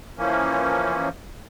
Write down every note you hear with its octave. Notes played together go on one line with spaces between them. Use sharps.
E3 F3 A#3 C#4